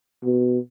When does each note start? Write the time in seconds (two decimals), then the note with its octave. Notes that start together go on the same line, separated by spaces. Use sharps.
0.24 B2